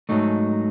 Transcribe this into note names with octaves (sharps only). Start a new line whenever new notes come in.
G#2 F#3 A3 D#4